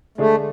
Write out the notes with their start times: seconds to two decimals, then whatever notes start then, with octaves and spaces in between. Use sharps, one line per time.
0.18 D3 G#3 A3 D4 G#4